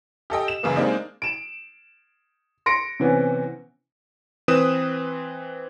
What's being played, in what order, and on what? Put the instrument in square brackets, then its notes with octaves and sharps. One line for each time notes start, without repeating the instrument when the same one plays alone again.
[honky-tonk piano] G4 A4 D#5 G5
E7
F#2 C#3 E3 A#3
G#3 A#3 C4 D4 D#4
[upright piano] D7 E7
C6 A#6 C#7 D7
C3 E3 B3 C#4
[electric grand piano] E3 C4 B4 D#6 E7